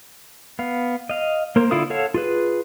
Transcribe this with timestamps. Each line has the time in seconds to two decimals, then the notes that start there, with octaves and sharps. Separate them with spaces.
0.59 B3 F5
1.10 D#5 F5
1.56 A#3 A#4 C5
1.71 D3 E4 F4 F5 D#6
1.90 A4 C#5 F5 F#5 A5
2.14 F4 G#4 B4